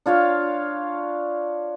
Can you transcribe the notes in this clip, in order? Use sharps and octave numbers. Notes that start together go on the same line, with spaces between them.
D4 F4 C#5 F5